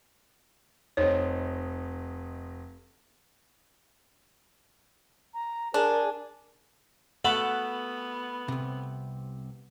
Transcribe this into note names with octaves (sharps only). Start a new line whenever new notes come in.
F1 C4 D#4 C#5
A#5
D4 G#4 A#4 G#5
A3 B3 F#5 A5 B5
C2 C3